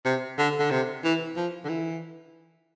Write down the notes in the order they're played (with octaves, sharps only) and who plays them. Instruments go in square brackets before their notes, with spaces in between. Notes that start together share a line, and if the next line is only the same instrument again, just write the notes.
[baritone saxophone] C3
D3
D3
C3
E3
F3
D3
E3